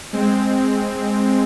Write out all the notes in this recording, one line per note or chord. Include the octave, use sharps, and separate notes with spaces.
G#3 C4